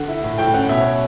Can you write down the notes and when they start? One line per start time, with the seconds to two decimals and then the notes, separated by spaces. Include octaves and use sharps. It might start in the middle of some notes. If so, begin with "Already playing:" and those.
Already playing: D3 F#5
0.08 E4
0.24 A2
0.38 A2 G5
0.54 C#4 F#5
0.69 B2 E5
0.80 C#5